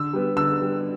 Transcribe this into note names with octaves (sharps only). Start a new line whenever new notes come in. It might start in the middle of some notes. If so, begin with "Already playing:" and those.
Already playing: D3 E6
G3 B3
D3 E6
G3 B3